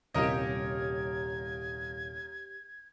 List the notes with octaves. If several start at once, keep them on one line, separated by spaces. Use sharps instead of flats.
D#1 C2 F4 G4 A#4 C#5 D#5 G#6